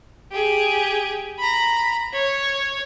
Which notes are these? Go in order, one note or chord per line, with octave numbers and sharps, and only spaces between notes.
G4 G#4
A#5 B5
C#5